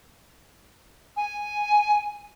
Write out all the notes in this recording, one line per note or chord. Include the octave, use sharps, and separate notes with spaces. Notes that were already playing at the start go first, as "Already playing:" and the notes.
G#5